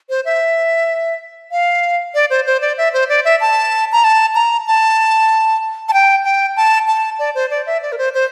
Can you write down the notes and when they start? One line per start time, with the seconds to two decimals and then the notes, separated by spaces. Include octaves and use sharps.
0.10 C5
0.25 E5
1.52 F5
2.15 D5
2.30 C5
2.46 C5
2.62 D5
2.78 E5
2.93 C5
3.09 D5
3.25 E5
3.41 A5
3.92 A#5
4.04 A5
4.35 A#5
4.67 A5
5.89 A5
5.93 G5
6.25 G5
6.56 A5
6.88 A5
7.19 D5
7.35 C5
7.51 D5
7.67 E5
7.82 D5
7.92 A#4
7.98 C5
8.14 C5